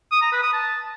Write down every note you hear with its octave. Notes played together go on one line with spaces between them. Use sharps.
D#6
A#5
B4
D#6
A5